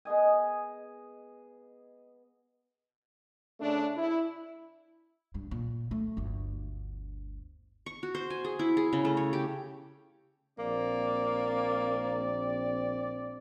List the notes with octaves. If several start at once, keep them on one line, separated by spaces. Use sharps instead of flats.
B3 G#4 D#5 G#5
C#3 A3 D4
E4
G2
A#2
A3
G1 D2
C#6
F#4
C5
G#5
G#4
E4
G#4
C#3
A3
C#5
G4
A#1 A#3 C4 D5